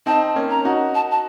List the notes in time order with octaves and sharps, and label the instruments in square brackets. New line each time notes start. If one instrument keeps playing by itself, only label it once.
[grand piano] C4 D#4 [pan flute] A5
[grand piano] A#3 C#4
[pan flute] A#5
[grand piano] D#4 F#4
[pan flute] A5
A5